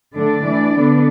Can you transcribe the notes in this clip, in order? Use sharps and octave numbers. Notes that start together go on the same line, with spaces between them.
D3 A3 D4 D5
E3 A3 D4
D3 B3 D4